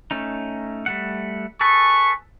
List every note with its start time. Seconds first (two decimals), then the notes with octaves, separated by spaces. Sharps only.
0.11 A3 C#4 D#4
0.86 G3 A3 F#5
1.61 G#4 A4 B4 C#6